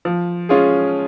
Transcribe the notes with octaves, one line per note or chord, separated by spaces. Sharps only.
F3
G#3 C#4 F4 G#4